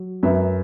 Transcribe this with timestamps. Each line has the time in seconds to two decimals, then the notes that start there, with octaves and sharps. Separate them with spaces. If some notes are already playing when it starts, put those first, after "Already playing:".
Already playing: F#3
0.23 F#2 B4 E5